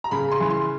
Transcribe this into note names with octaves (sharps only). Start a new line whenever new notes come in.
A#5
C#3 B5
C6
E3
C6